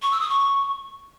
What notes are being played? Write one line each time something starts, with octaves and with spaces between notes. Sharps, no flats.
C#6
E6
D#6
C#6